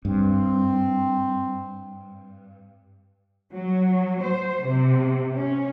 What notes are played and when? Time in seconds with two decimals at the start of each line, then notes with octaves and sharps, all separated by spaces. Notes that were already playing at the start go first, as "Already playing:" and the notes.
0.05 G2 C4
3.53 F#3
4.23 C5
4.65 C3
5.36 C#4